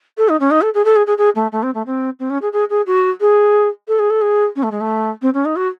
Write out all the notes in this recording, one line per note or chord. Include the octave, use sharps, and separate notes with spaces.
A4
D#4
C#4
D#4
A4
G#4
A4
G#4
G#4
G#4
A3
A3
C4
A3
C4
C4
C#4
G#4
G#4
G#4
F#4
G#4
A4
G#4
A4
G#4
C#4
A3
G#3
A3
C4
C#4
D#4
F#4